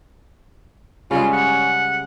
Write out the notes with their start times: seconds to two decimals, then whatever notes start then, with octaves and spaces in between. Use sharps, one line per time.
1.11 C#3 G3 G#3 C#4 F4
1.33 F#5